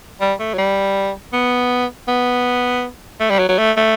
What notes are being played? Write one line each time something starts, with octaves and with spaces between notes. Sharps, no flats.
G3
A3
F#3
G3
B3
B3
A3
G3
F#3
F#3
A3
A3